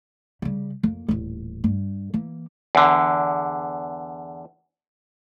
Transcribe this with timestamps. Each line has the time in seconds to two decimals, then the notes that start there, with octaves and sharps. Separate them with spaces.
0.42 C#3 G3
0.83 F2 A#3
1.08 D#1 A1
1.64 G2
2.14 E3 A#3
2.75 E2 D3